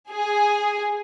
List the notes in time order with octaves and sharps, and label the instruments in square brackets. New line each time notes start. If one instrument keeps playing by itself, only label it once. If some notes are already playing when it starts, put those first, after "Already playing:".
[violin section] G#4